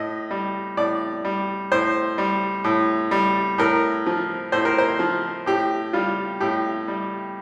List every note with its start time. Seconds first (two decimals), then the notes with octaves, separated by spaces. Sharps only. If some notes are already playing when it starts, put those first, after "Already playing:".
Already playing: A2 D#5
0.31 G3
0.77 A2 D5
1.25 G3
1.72 A2 C5
2.18 G3
2.64 A2
3.11 G3
3.58 A2 A#4
4.06 F3
4.52 A2 C5
4.65 A#4
4.78 C5
4.99 F3
5.46 A2 G4
5.93 G3 F4
6.40 A2 G4
6.88 G3